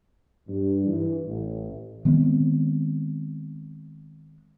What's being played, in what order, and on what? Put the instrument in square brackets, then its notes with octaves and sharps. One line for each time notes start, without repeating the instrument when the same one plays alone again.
[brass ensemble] G2
E3
A1
[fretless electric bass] D#3 G#3 B3 C4